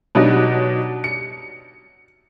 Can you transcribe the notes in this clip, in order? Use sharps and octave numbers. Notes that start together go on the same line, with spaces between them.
B2 F#3 D4 D#4 F#4
C#7